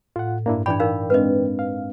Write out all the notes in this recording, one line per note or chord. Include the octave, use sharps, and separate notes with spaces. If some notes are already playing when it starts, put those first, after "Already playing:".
A2 F4 F#5
G2 A#3 D4 E4
E3 D4 D5 G5 B5
D#4 A#4 F5
G#3 C4 D4 B4 D#5
F5